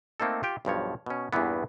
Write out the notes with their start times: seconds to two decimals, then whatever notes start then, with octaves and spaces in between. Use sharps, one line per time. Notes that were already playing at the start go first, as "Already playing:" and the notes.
0.20 A3 A#3 C4 D#4 A4
0.43 F4 G4 G5
0.65 B1 G2 F3 C#5
1.06 B2 C#4
1.33 E2 G2 A#2 E3 B3